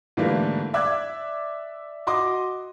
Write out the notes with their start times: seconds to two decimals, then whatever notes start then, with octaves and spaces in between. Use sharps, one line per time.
0.17 G#2 D3 E3 G3 A3 A#3
0.74 D5 E5 D6 E6 F#6 G#6
2.07 F#4 D#5 C6 D6 D#6